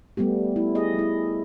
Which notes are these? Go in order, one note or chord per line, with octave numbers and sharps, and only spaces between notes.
G3 A3 B3 G4
E4
G#4 D#5
G3 E4